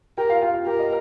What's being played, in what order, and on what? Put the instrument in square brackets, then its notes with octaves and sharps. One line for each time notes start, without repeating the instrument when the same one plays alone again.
[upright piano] G4 G5 [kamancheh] A#4
[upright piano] F4 F5
F4 F5
F4 F5
[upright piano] G4 G5 [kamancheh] A#4
[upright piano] D#5